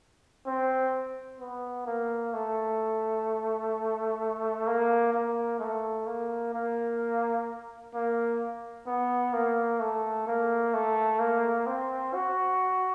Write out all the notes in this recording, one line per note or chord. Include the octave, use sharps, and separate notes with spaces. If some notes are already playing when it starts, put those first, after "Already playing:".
C4
B3
A#3
A3
A#3
A#3
A3
A#3
A#3
A#3
B3
A#3
A3
A#3
A3
A#3
C4
F#4